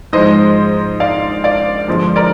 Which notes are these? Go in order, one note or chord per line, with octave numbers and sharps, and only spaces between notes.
G#2 F3 G#3 C5 D#5
D5 F5
D5 F5
G2 D3 F3 G#3
A#4 D5